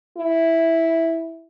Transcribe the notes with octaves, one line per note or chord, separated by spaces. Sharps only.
E4